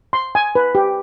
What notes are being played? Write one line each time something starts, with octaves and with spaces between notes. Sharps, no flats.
C6
G#5
B4
G4